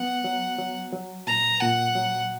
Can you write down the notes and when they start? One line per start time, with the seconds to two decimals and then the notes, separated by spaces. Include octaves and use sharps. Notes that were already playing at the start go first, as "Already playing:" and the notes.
Already playing: F#3 B3 F#5
0.24 F#3
0.58 F#3
0.93 F#3
1.27 A#2 A#5
1.61 A#2 F#5
1.95 F#3